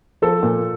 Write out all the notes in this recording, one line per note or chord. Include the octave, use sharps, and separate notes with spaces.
F3 A4
A#2